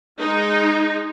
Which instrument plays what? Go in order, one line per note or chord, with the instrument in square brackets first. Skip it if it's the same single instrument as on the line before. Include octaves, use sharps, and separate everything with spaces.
[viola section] G#3 D#4